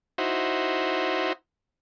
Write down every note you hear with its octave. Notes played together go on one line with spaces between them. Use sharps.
D#4 E4 F#4 C5